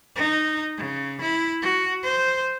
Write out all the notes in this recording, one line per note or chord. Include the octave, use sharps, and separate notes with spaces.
D#4
C#3
E4
F#4
C5